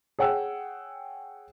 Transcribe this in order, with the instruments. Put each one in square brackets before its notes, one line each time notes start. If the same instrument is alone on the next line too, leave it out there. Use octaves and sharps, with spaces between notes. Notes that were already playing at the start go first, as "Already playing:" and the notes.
[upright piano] G#4 C#5 F#5 G5 E6